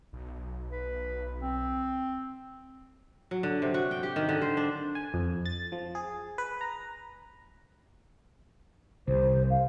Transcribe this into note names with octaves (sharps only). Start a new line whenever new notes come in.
B1
B4
C4
F#3
D3
C3
F#4
G5
G4
D#3
D3
C5
D4
G#5
F2
A6
F3
G#4
B4
A#5
C2 C5
F5